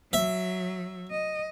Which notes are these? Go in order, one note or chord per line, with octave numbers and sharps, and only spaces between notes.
F#3 E5
D#5